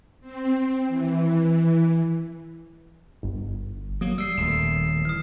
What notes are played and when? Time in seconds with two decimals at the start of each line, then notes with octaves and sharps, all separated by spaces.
0.20 C4
0.88 E3
3.23 G1
4.01 F#3 A#3 D#6
4.18 G3 E6 C7
4.38 D#1 D#2 A3 E7
5.05 E3 D#6 F6